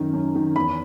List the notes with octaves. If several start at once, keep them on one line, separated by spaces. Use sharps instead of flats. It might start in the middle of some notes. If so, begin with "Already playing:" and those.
Already playing: F#2 D#3
F#2
D#3
E2 B5